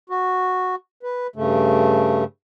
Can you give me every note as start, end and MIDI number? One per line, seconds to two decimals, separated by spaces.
0.10 0.75 66
1.03 1.27 71
1.36 2.24 43
1.36 2.24 49
1.36 2.24 57